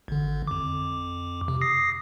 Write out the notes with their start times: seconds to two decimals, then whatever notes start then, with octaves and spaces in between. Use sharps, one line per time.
0.08 G#1 D3
0.47 F2 D6
1.48 C3
1.61 D#6 A#6 C7